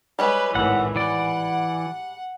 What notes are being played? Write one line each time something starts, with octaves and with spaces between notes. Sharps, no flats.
G3 G#3 B4 C#5
G#1 A2 E3 F#5
E3 D5 F#5